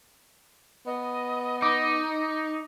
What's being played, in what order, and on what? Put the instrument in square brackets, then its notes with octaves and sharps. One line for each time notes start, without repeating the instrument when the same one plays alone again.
[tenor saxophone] B3 [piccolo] D#5
[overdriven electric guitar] D#4 [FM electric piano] D6